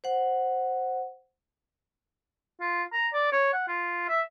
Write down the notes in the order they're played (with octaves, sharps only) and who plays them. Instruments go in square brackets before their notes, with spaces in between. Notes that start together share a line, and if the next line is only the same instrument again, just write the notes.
[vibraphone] C5 F#5
[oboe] F4
A#5
D5
C#5
F#5
F4
E5